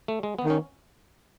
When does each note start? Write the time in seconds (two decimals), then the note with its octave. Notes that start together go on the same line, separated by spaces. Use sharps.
0.08 A3
0.23 G#3
0.39 B3
0.44 D#3
0.50 C#4